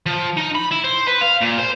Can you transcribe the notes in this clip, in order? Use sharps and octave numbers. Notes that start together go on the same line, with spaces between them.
F3
D#4
B5
E4
C5
B4
F5
A#2
C5